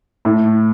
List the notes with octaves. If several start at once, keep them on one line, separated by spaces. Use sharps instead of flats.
A2